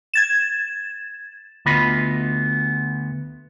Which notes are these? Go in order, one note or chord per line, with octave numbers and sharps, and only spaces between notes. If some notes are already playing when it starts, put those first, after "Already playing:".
G#6 A6 E7
D2 B3 F4 D#5 B5